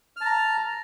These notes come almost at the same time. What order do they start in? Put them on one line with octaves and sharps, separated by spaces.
F6 A5 A#5